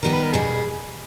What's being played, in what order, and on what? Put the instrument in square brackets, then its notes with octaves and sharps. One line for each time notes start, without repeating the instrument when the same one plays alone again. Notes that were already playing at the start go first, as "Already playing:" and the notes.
[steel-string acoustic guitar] D#3 G3 B3 G4 [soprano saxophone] A#4
[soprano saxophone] B4
A#4
[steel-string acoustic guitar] E2 B2 G3 [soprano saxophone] G#4